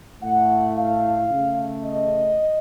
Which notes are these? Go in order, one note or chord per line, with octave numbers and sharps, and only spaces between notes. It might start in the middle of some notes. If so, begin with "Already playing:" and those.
A2 A3 F#5
F5
C#3
A3
D#5